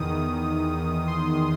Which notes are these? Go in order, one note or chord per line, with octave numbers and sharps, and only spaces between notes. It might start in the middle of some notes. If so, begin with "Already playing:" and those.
Already playing: E2 D#3 D#6
C6